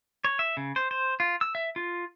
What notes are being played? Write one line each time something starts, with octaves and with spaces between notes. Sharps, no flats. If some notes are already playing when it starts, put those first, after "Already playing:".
C#5
E5
C#3
C5
C5
F4
E6
E5
F4